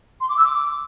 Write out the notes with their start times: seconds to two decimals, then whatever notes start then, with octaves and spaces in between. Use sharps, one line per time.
0.21 C6
0.29 D6
0.37 E6
0.45 D6